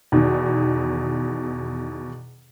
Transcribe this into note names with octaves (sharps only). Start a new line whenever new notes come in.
E2 B2 D#3